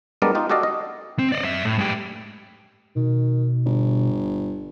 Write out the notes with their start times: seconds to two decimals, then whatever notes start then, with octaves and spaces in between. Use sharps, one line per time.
0.22 G3 G#3 B3 D4 A#4 D5
0.35 D#4 F4 G4
0.49 F#4 G4 A4 D5 D#5 F5
0.63 D#5
1.19 C4
1.32 D5 D#5
1.44 F#2 E5
1.65 A2
1.78 G#2 G4
2.96 B2 D#3
3.65 G1